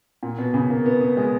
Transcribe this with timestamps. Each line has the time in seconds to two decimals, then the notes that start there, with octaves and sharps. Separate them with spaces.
0.23 A#2
0.38 B2
0.54 C#3
0.70 A#3
0.86 B3
1.01 B3
1.17 G#3